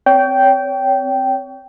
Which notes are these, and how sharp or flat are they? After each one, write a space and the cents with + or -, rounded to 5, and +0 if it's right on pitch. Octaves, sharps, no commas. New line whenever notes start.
C4 +0 C#5 +30 G5 -10